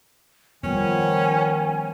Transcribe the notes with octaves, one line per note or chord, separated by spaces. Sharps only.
D#3 F3 G3 B3 C#4 G#5